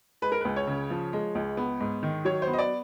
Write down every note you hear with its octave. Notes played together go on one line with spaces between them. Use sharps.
G#3 B4
A#4
C#2 B4
C#5
C#3
F3
G#3
C#2
B3
G#2
D#3
F#3 C#5
C5
B3
D#5
D5